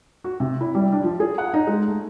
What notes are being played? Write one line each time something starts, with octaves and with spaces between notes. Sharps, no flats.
F#4
C3
E4
G3
D4
F3
G#4
F#5
D#4
G#3
A3